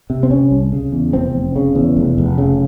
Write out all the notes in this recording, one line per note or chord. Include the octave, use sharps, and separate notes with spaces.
C3
C4
C3 C#4
C2
C#3
E2
F1 C4
F1
C#3
E2
F1
F1
C#3